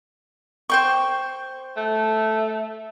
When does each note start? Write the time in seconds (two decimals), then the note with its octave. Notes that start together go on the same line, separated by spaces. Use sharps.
0.70 C5 G5 C#6
1.77 A3